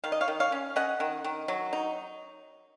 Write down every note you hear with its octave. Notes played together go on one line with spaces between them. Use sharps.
D#3 F5
D#5
C#5 F5
D#3
C#5 F5
C#4
C#4 D#5 F#5
D#3
D#3
F#3
D#4